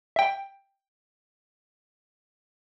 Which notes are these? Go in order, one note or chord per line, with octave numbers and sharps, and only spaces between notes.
E5 G5